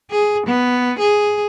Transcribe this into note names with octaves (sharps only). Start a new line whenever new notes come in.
G#4
B3
G#4